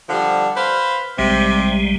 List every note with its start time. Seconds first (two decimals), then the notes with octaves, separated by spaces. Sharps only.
0.09 D3 F3 G3
0.57 B4 C5 F5
1.19 A#1 C3 G3 G#3